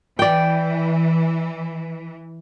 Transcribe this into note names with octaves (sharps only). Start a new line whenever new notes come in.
E3 D5 G5